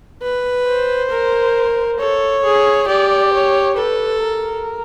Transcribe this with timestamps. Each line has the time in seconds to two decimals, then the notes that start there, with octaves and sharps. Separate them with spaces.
0.22 B4
0.67 C5
1.11 A#4
1.99 A4 C#5
2.44 G#4
2.88 G4 D5
3.33 C#5
3.77 A4 B4
4.21 A#4